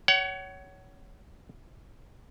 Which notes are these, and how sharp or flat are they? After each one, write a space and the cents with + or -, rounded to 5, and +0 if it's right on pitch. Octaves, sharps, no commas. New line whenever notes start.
C#5 +15 F#5 +35